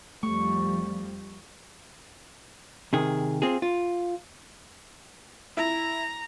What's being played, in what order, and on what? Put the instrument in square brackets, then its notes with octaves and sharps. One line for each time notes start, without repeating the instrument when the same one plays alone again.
[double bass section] F2 F3 G3 [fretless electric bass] A3 [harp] C#6
[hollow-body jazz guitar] C3 D#3 G#4
C4 F4 G#4
F4
[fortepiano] E4 [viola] A#5